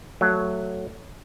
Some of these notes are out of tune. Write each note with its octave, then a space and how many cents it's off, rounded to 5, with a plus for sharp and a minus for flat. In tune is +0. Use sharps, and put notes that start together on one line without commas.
F#3 +0 A3 +10